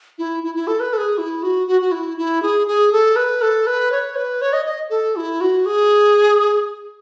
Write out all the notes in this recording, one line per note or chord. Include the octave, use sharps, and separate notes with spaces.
E4
E4
E4
A4
B4
A4
G#4
E4
F#4
F#4
F#4
E4
E4
G#4
G#4
A4
B4
A4
B4
C#5
B4
C#5
D#5
D#5
A4
E4
F#4
G#4